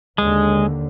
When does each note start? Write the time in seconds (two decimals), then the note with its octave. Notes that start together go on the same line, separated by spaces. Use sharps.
0.18 D#2 D3 G#3